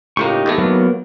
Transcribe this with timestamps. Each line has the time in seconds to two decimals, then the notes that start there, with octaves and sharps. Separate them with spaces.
0.17 C#2 A2 A#3 D#4 G4 C#6
0.46 E2 D#3 A3
0.58 F#3 A#3 B3